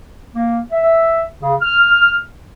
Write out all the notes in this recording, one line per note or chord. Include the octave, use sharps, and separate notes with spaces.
A#3
E5
C#3
F6